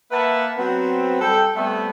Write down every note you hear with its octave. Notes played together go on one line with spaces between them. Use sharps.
A#3 B4 E5 F#5 A5
F#3 B3 C4
G3 A4 G5
G3 A3 B3 C4 E5